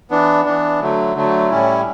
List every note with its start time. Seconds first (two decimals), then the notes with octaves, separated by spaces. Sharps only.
0.10 E3 B3 D4
0.45 E3 B3 D4
0.81 D3 F#3 A3
1.15 D3 F#3 A3
1.50 A2 G3 C#4 E4